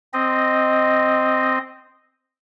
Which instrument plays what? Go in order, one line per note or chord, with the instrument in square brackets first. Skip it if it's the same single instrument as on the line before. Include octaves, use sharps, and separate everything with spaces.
[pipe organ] C4 D#5